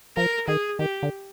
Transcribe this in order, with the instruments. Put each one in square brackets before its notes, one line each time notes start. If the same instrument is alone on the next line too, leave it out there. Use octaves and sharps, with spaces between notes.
[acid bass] F3 [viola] A#4
[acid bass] D#3 [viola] G#4
[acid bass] D#3 [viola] G4
[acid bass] D3